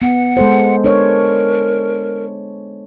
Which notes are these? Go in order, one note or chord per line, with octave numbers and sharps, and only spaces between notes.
B3 F#5
G#3 A4 C5
D4 A#4 C#5